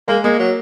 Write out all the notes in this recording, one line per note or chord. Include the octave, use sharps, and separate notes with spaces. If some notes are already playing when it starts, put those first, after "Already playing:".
G#3 A#3
G#3 A#3
F#3